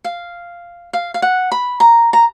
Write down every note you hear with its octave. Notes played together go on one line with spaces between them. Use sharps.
F5
F5
F5
F#5
B5
A#5
A#5